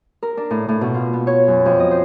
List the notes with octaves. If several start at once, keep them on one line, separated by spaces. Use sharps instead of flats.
A#4
D4
A2
A2
B2
F4
B3
C#5
F#2
F2
D#5
C5